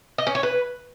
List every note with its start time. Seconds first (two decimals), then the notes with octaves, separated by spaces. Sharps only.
0.18 D#5
0.27 C#4
0.35 C#5
0.43 B4